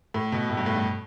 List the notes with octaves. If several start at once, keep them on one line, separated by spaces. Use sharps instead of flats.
A2
B2
A2
G2
A2
G2